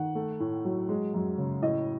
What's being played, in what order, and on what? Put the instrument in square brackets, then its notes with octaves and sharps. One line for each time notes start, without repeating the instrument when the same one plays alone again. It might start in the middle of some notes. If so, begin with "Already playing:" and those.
Already playing: [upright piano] D#3 F#5
A3
A2
F#3
G#3
F#2
C#3
A2 D#5